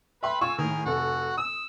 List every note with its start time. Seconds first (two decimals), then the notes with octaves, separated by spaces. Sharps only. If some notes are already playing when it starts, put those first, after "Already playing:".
0.23 B4 E5 G5 B5 C6
0.41 F4 F5 G#5 C#6 E6
0.58 A2 D#3 G#4 A#4
0.86 F1 F#4 A4
1.37 D#6 E6